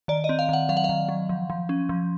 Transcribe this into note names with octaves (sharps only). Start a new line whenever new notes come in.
D#3 D5
D#5
C4
F5
D#3 F#5
F#3 F5
F#5
F5
D#3
F#3
F3
F3
C#4
F3